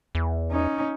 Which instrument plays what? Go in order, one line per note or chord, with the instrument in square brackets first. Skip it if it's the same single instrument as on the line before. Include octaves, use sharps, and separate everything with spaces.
[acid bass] E2
[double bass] C#4 D#4